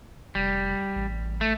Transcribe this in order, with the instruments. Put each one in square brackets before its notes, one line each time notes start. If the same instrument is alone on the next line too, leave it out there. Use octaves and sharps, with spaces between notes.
[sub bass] F1 [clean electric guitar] G3
[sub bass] A1
[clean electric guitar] A3